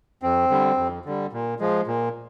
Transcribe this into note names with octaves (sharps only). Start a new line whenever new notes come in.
F2 C4
D3 G3
F2
D3 G3
A#2
F3 G#3
A#2